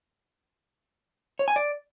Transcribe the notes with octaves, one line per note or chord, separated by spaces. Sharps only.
C#5
G#5
D5